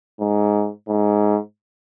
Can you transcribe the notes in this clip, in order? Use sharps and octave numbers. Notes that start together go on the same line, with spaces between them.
G#2
G#2